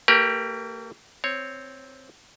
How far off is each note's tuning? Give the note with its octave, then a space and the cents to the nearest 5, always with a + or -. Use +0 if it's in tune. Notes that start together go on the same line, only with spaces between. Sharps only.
A#3 -45 G4 +0 A#4 +45
C4 +0 C#5 +0